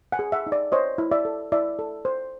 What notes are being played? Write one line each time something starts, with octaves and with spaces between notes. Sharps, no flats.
F#5 G#5
G#4
E5 F#5
D#4
D5
C5 C#5 D#5
E4
D5 E5
A4
E4 D5 E5
A4
C5